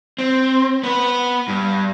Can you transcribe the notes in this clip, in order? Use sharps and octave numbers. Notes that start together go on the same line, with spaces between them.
C4
B3 B4
G2